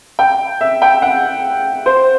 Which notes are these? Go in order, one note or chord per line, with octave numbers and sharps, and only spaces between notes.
G5
E5
G5
F#5
C5